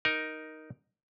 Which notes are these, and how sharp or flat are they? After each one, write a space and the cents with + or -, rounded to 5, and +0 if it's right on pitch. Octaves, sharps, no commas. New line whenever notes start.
D#4 +0 A#4 +10